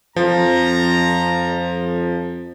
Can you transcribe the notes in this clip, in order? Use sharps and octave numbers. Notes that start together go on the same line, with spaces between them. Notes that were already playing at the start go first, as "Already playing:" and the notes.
F2 F3 A#5